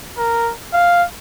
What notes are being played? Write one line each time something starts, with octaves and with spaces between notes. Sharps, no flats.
A#4
F5